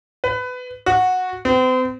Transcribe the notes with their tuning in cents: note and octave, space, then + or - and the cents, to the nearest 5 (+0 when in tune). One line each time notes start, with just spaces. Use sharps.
B4 +20
F#4 -10
C4 -40